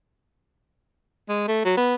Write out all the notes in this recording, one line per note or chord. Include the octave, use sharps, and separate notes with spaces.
G#3
A3
F#3
B3